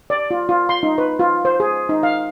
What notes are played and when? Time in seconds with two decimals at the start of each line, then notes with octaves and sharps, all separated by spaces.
0.10 D5
0.31 F4
0.49 F4
0.69 C6
0.83 D#4
0.98 B4
1.19 F4
1.45 C5
1.60 G#4
1.89 D#4
2.03 F5